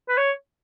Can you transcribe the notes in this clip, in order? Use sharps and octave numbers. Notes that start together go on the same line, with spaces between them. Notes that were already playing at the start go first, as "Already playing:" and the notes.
B4
C#5